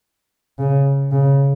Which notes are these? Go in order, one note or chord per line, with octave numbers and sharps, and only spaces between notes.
C#3
C#3